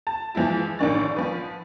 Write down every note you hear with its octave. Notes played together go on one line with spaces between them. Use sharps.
A5
E3 F3 G#3 E4
A1 D#3 A#3 D4 C#6 A6
F3 B4